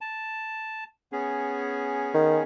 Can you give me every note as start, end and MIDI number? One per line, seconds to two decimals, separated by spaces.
0.01 0.84 81
1.12 2.43 59
1.12 2.43 61
1.12 2.43 68
2.14 2.40 51